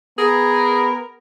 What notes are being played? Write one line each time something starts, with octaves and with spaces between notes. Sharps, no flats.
B3 G#4 A#4